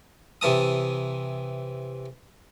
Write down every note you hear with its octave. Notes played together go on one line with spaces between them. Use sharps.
C3 E3 A5 D#6